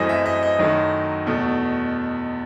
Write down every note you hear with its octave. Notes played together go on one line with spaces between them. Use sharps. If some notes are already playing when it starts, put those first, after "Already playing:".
Already playing: F#2 E3 A3 C4 D#5
E5
D#5
D#5
F#2 D#3 F#3 A3
E2 B2 A3